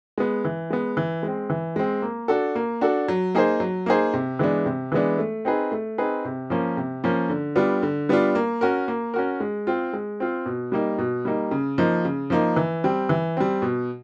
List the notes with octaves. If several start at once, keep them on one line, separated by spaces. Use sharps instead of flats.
G#3 B3
E3
G#3 B3
E3
G#3 C4
E3
G#3 C4
A#3
D4 F#4 A4
A#3
D4 F#4 A4
F#3
A#3 D#4 G#4 C5
F#3
A#3 D#4 G#4 C5
C3
E3 G#3 B3 D4
C3
E3 G#3 B3 D4
A3
C4 D#4 G#4 B4
A3
C4 D#4 G#4 B4
C3
F3 A#3 C#4
C3
F3 A#3 C#4
D3
G3 B3 D4 F4
D3
G3 B3 D4 F4
A#3
C#4 F#4 A#4
A#3
C#4 F#4 A#4
G#3
C4 F4
G#3
C4 F4
B2
G3 A#3 D#4
B2
G3 A#3 D#4
C#3
F3 A#3 D#4
C#3
F3 A#3 D#4
E3
G3 C4
E3
G3 C4
B2